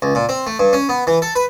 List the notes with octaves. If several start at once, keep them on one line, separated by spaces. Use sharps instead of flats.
C#2
A#2
C4
A3
G2
C#4
B3
E3
A4
B4